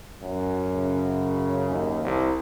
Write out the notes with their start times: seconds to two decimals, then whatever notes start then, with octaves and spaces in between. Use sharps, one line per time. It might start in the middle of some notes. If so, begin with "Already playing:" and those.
0.23 F#2
0.75 C#3
1.70 D#2
2.04 C2